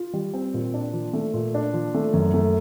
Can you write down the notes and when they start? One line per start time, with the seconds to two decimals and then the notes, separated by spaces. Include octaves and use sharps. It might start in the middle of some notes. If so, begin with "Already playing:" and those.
Already playing: F4
0.13 G3
0.34 C4
0.54 A#2
0.74 D4
0.93 F3
1.13 A3
1.34 A#2
1.54 D4
1.74 F3
1.94 A3
2.14 F#2
2.34 A3